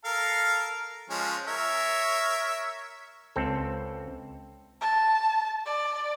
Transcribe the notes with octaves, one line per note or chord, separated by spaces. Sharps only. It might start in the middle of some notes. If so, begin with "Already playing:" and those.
A4 A#4 F5
F3 G#3 C#4
A#4 C#5 E5
C#2 C4 A4
A5
D5